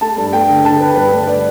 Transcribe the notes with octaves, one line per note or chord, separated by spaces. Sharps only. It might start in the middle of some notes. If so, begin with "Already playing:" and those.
A3 A5
G2
A3 G5
D3
D3 A5
A3 B4
G2 B4
A3
D5